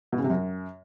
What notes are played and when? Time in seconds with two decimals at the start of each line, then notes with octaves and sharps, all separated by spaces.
0.12 B2
0.18 C#3
0.24 C3
0.30 F#2